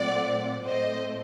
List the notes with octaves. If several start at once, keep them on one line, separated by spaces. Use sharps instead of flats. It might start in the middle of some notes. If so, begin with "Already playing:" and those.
Already playing: A#2 F#3 A3 C4 D5 F#5
A2 A3 C4 C5 D#5